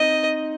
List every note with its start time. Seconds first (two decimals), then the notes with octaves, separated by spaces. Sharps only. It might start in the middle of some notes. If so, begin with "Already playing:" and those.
Already playing: C4 D#4 D#5